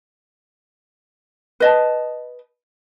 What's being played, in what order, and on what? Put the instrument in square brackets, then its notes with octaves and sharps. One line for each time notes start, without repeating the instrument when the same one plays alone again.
[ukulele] B4 D#5 A5